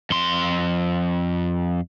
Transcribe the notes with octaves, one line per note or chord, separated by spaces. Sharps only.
F2 C6